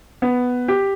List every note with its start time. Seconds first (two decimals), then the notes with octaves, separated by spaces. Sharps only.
0.22 B3
0.68 G4